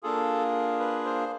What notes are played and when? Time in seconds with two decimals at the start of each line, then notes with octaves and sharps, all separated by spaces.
0.03 A#3 D4 F4 G#4 A4
0.80 B4
1.05 C5